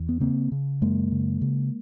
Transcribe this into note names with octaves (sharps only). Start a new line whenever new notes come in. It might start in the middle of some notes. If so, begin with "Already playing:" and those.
Already playing: E2
B3
C#3 A#3 C4
C#3
F#2 G#3 A#3
C#3
C#3